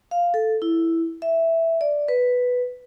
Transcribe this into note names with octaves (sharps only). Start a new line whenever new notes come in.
F5
A4
E4
E5
D5
B4